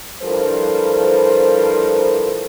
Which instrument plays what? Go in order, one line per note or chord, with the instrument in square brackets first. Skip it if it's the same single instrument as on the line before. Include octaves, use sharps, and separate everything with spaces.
[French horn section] G2 F3 E4 A4 A#4 C5